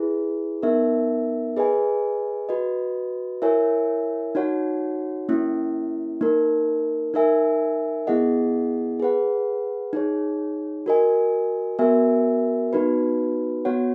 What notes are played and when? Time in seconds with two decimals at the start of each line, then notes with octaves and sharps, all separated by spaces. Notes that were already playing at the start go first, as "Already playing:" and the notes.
Already playing: E4 G#4 B4
0.62 B3 D#4 A#4 E5
1.57 G#4 B4 D#5 G#5
2.49 F#4 B4 D#5
3.42 E4 A#4 C#5 E5 G#5
4.35 D#4 F#4 C#5 F#5
5.29 A#3 C#4 E4
6.21 A#3 D#4 A#4
7.14 D#4 A#4 E5 G#5
8.07 B3 E4 G#4 D#5 F#5
9.00 G#4 B4 F#5
9.93 D#4 G#4 C#5
10.86 F#4 A#4 D#5 G#5
11.79 B3 F#4 A#4 E5 G#5
12.73 B3 D#4 F#4 B4
13.65 B3 F#4 C#5 F#5